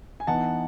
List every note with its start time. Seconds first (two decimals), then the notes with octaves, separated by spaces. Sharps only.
0.20 G#5
0.27 E3 B3 D#4 F#5 A5